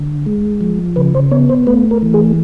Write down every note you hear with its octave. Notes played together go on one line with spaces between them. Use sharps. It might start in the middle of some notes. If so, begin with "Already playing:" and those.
Already playing: D3
G#3
F3
C#3 B4
C5
B3 C#5
C5
A3 B4
A#4
E3
G#4